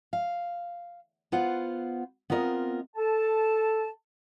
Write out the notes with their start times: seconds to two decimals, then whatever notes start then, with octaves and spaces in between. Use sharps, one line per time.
0.13 F5
1.32 B3 F4 C5 F#5
2.30 B3 C4 F4 A#4 D5 D#5
2.95 A4 A5